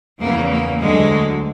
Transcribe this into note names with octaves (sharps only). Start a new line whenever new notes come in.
E2 C#3 E3 A#3
A#3
D2 D3 F#3 G#3